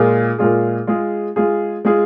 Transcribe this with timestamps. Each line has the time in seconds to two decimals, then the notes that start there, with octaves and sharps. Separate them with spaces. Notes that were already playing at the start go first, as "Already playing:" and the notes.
Already playing: A#2 G#3 F4 G#4
0.39 A#2 G#3 F4 G#4
0.87 G#3 F4 G#4
1.36 G#3 F4 G#4
1.85 G#3 F4 G#4